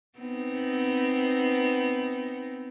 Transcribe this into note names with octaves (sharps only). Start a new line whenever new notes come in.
B3 C4 D#4